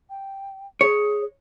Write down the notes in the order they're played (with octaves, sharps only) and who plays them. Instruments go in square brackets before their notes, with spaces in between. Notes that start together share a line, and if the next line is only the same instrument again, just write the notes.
[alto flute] G5
[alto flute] G#4 [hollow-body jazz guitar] C#5